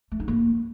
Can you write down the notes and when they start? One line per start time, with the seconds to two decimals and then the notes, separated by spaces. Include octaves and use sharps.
0.12 A3
0.20 D#4
0.28 A#3